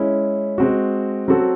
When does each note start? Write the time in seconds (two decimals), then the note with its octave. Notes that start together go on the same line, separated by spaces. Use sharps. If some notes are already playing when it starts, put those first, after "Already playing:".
Already playing: G#3 C#4 E4
0.58 G#3 C4 F#4
1.28 F#3 C4 F#4 A4